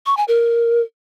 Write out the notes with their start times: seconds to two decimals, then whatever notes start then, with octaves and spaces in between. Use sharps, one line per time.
0.06 C#6
0.17 G#5
0.28 A#4